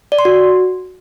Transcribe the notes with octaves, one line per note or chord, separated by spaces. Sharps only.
D5
C6
F#4